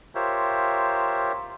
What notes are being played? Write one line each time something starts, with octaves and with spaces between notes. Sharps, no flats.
F4 G4 A#4 C5 C#5 E5